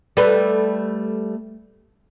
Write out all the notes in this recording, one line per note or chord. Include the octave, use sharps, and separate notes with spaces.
G3 A3 B4